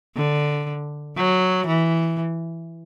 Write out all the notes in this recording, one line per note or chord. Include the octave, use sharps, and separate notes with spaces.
D3
F#3
E3